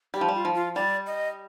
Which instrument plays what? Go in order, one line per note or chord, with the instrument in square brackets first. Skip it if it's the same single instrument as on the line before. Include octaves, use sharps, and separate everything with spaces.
[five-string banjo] G3 [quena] G4
[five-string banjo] F3
G3
[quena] F4
[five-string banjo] F3
[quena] F4
[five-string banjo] G3 [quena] D5
[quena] D#5